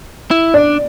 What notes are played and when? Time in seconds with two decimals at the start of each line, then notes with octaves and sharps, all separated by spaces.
0.31 E4
0.54 D4 D5